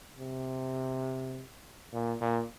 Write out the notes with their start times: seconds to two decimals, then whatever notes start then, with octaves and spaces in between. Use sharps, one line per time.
0.19 C3
1.93 A#2
2.21 A#2